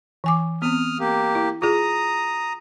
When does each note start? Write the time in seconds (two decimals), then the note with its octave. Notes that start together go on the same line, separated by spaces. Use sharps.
0.24 E3 G#5 D6
0.62 B3 C4 D#6 F6
1.00 A#3 G4
1.35 E4
1.62 F4 G#4 A#5 D#6